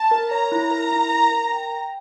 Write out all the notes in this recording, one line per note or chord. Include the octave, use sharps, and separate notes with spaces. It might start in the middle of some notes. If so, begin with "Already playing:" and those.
Already playing: A5
A#4
C#5 A#5
E4
A#4
E4
A#4
A#4
G5
G5